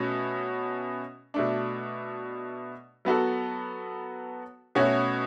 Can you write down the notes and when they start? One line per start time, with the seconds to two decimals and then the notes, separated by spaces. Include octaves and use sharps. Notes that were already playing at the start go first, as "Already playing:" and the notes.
Already playing: B2 A3 C#4 F#4
1.34 B2 A3 D4
3.05 F#3 B3 F#4 A4
4.75 B2 A3 C#4 F#4 C#5